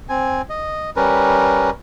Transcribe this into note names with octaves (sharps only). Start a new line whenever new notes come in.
C4 G#5
D#5
G3 C#4 A#4 B4